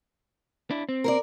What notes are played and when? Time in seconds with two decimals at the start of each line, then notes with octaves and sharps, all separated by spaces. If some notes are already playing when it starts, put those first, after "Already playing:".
0.71 D4 E4
0.89 C4
1.04 A#4 C5 D5